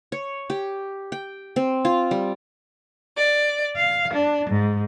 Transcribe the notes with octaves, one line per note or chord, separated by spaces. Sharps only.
C#5
G4
G5
C4
F4
G3
D5
F5
D4
G#2